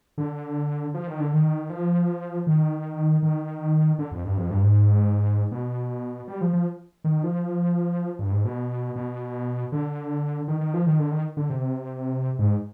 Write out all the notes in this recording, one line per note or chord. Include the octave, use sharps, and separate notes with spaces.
D3
F3
D#3
D3
D#3
F3
D#3
D#3
D3
F2
G2
F2
G2
G#2
B2
G3
F3
F3
D#3
F3
G2
G#2
B2
B2
D3
D#3
D#3
F3
D#3
D3
D#3
D3
C3
G#2